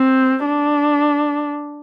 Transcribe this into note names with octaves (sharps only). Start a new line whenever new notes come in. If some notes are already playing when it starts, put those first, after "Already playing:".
Already playing: C4
D4